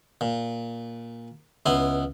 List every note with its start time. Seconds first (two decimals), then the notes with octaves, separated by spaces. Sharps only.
0.21 A#2
1.66 C#2 B3 E4 C6